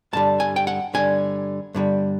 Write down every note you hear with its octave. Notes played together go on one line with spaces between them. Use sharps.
G2 D3 G3 A5
G#5
G5
F#5
G2 D3 G3 G#5
G2 D3 G3